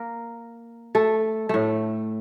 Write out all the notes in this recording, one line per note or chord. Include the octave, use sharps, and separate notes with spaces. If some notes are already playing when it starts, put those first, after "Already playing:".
Already playing: A#3 A#4
A3 A4
A2 A3